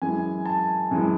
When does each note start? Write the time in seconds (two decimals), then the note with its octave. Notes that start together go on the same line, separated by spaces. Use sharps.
0.02 F#2 E3 G#3 G#5
0.45 A5
0.91 F#2 E3 G#3